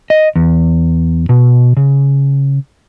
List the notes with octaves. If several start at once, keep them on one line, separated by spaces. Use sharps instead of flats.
D#5
E2
B2
C#3